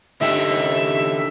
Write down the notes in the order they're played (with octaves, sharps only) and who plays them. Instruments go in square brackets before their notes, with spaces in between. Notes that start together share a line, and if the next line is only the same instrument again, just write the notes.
[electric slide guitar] D3 D#4 G4 [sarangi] E5